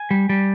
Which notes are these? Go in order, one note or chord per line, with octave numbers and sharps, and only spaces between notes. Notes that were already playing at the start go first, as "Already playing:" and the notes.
Already playing: G#5
G3
G3